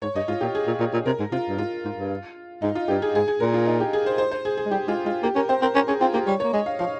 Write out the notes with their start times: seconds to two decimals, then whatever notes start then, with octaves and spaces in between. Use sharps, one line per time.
0.02 G#2 C#5
0.15 G2 D#5
0.28 G#2 F4
0.41 A#2 G4
0.55 G#4
0.67 A#2
0.80 A#2
0.93 A#2
1.06 C3 A#4
1.20 G#2
1.32 C3 F4
1.49 G2
1.58 G#2 F4
1.85 G#2
1.97 G2
2.62 G#2 D#4
2.75 F4
2.88 G2 G4
3.02 G#4
3.14 G#2 G#4
3.28 G#4
3.40 A#2 A#4
3.54 F4
3.66 D#4
3.80 G4
3.93 G#4
4.06 C5
4.18 C5
4.31 C5
4.45 G#4
4.57 G#4
4.66 G#3
4.71 G3 G4
4.88 G#3 F4
5.05 G#3 F4
5.23 A#3 G4
5.35 C#4 A#4
5.49 C4 C5
5.62 C4 A#4
5.75 C#4 A#4
5.88 C#4 G#4
6.01 C4 F4
6.14 A#3 G4
6.27 G3 C#5
6.40 A#3 C#5
6.53 G#3 D#5
6.66 F5
6.79 F3 F5